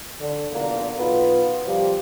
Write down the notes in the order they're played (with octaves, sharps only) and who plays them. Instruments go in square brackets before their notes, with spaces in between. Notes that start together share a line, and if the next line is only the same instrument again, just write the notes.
[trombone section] D3
B1 E2 A#2 D3 A#3
B1 B3 F4
C3 F3 G3 A#3 F4 G4